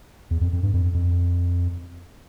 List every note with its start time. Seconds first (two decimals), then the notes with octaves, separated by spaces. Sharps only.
0.31 E2
0.41 F2
0.53 F2
0.63 G2
0.74 F2
0.94 F2